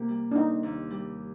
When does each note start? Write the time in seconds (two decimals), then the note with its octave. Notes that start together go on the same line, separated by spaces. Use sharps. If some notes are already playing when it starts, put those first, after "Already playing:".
Already playing: C3 A#3
0.08 G3
0.31 D4
0.35 C4 D#4
0.63 D#2
0.91 G3